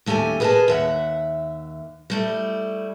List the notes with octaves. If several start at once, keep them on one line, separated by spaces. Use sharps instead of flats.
D#2 A3 C#4 G4 G#5
G#4 A#4 B4 D#5 G#5 A5
D#2 E5 F#5
G3 A3 E4